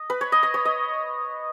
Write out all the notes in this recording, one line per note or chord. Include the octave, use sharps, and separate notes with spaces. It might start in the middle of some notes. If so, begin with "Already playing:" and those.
Already playing: D#5
B4
C#5
D#5
D#5
C#5
D#5